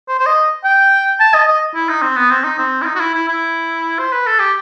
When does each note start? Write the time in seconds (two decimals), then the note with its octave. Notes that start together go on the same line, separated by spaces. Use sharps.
0.08 C5
0.19 C5
0.26 D#5
0.65 G5
1.20 A5
1.34 D#5
1.48 D#5
1.75 E4
1.89 D#4
2.02 C4
2.16 B3
2.31 C4
2.44 D#4
2.58 C4
2.82 E4
2.85 D#4
2.96 F#4
3.00 E4
3.14 E4
3.28 E4
3.99 C5
4.12 B4
4.26 A4
4.39 G4